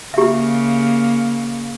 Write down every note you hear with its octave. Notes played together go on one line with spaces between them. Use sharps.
C#3 A#3 G4 E5